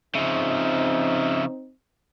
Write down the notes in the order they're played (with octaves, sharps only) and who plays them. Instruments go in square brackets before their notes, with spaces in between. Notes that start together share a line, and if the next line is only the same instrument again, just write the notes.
[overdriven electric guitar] C#3 F3 [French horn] C4 [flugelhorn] D#4 [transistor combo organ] E5